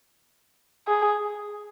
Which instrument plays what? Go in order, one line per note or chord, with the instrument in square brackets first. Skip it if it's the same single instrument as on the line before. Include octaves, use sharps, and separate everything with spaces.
[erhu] G#4